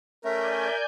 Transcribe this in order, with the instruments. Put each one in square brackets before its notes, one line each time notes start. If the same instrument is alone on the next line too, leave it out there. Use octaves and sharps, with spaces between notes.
[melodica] A3 C#4 [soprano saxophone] A#4 [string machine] D5 G#5 G6 [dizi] E5